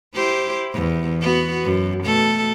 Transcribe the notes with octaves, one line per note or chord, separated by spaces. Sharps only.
E4 G4 C5
E2
B3 F#4
F#2
B2 A3 A4